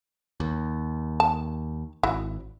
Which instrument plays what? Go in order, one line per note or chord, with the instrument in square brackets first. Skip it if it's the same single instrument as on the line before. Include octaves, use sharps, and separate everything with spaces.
[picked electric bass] D#2
[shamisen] A5
[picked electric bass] G#1 [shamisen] E4 F#4